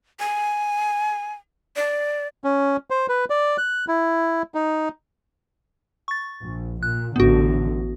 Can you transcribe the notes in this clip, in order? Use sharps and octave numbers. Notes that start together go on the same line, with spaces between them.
G#5
D5
C#4
C5
B4
D5
F#6
E4
D#4
C#6 A6
A#1
A#2 F#6
A1 D3 B3 F#4